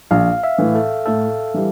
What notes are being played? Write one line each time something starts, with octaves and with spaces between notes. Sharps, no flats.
A#1 F5
E5
A2 E3
A4
A2 A4
E3 G3